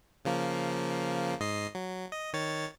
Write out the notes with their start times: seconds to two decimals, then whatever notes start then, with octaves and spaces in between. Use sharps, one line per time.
0.25 C#3 F3 A#3
1.40 G#2 D#5 C7
1.75 F#3
2.12 D#5
2.33 D#3 C#5 A6